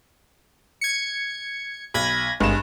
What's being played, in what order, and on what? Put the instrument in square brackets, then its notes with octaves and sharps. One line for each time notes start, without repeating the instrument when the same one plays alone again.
[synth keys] G#6 C#7
[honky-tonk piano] B1 [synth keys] B5 G#6 A#6
[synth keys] G#1 G#3 [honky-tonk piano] G2 E7